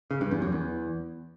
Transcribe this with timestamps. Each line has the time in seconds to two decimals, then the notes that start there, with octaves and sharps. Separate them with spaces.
0.11 C#3
0.21 G2
0.31 E2
0.42 F#2
0.52 E2